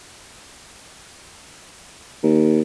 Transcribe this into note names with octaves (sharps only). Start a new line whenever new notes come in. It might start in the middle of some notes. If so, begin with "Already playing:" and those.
D#2